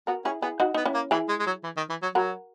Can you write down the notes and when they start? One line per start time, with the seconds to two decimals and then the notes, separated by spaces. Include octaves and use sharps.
0.07 B3 F#4 A#4
0.25 C#4 E4 G#4
0.42 B3 E4 G#4
0.60 D#4 F#4
0.74 B3 D#4
0.85 C#4 E4
0.94 A#3
1.11 E3 E4 G#4
1.29 G#3
1.39 G#3
1.46 F#3
1.64 E3
1.77 D#3
1.89 E3
2.02 F#3
2.15 F#3 F#4 A#4